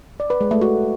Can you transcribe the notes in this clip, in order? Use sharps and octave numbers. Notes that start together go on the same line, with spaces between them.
D5
B4
G#3
A3
F#4